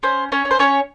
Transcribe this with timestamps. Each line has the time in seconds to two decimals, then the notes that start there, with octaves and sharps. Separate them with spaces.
0.03 C#4 C5
0.32 C#4 C#5
0.45 C#4
0.51 C5
0.59 C#4 C#5